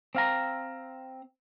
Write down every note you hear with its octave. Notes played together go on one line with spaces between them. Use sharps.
C4 F5 A#5